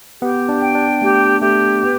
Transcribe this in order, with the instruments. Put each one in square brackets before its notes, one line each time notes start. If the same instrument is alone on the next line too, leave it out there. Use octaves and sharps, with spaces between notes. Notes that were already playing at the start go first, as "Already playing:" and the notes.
[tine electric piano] B3 [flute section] G4
[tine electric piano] D4
[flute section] G5
[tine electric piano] D4
[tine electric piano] A3 [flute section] G4
[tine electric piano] A3 [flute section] G4
[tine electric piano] B3 [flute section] B4